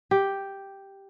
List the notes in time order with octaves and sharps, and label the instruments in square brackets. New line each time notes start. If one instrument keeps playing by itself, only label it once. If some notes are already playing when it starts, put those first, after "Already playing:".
[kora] G4